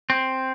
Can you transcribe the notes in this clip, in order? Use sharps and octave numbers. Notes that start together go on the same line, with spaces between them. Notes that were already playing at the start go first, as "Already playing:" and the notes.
C4